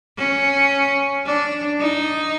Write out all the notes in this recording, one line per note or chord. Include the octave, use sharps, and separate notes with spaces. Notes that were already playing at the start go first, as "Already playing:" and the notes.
C#4
D4
D#4